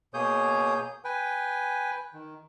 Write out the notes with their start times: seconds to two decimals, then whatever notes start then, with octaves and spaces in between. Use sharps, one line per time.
0.14 B2 A#3 G#4 C#5 D#6 G6
1.05 B4 G5 G#5
2.14 D#3